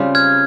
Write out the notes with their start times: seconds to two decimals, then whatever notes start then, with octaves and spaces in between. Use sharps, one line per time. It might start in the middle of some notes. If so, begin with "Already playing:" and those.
Already playing: C#3 G3 C4 F4
0.15 F6 G#6